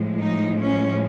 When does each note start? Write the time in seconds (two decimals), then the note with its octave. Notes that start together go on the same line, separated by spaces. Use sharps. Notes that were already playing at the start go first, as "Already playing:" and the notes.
Already playing: A2 F3 G#3
0.20 D#4
0.61 C#4